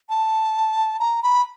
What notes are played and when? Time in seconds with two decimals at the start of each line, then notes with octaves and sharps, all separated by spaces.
0.10 A5
1.00 A#5
1.23 B5